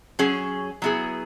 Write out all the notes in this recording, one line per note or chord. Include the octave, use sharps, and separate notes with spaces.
F#3 C#4 G#4
F#3 B3 E4 G#4